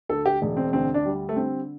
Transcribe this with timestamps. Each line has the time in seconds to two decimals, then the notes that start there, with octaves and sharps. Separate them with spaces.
0.09 D2 A4
0.26 G4
0.42 E1
0.57 C4
0.73 D2 C4
0.94 D4
1.05 G3
1.29 A3
1.36 D3 C4